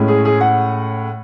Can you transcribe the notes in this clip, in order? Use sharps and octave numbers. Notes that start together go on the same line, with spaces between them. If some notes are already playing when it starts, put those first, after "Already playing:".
Already playing: A2 G#3 C#4
G#4
G#4
F#5